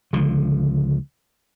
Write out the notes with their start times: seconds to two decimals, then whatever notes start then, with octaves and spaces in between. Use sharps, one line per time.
0.13 C#2 D3 F3